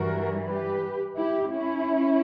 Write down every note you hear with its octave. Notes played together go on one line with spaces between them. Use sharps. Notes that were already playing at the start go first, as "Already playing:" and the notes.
Already playing: G2 E3 G3 F#4 A#4
G4 B4
E4 G4
C#4 E4